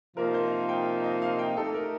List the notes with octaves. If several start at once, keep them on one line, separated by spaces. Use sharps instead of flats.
C3 F3 A#3 D#4 A#4
C5
F5
G5
D#5
F5
G5
A3 D#4 G4 A4
A#4